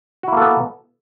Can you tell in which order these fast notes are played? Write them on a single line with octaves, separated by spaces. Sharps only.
F#4 E4 A#3 A4 B3